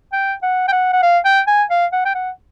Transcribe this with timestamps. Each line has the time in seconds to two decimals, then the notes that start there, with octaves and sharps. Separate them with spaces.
0.13 G5
0.43 F#5
0.68 G5
0.72 F#5
0.93 F#5
1.03 F5
1.25 G5
1.47 G#5
1.70 F5
1.93 F#5
2.05 G5
2.15 F#5